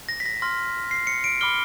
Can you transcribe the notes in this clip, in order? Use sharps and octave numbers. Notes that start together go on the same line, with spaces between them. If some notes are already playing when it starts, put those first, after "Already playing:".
A#6
B6
A#6
C6 F6 A#6
C7
C#7
D7
B5 D6 F6 G7